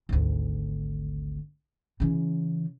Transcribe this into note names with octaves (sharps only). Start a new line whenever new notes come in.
G#1 D2
C#3 E3